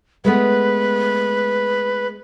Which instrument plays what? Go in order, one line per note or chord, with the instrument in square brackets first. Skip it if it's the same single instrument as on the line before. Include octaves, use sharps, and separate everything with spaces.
[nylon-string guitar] G#3 A3 B3 [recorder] B4